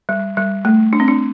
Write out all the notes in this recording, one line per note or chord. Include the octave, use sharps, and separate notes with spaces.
G3
G3
A3
D4
C4
D4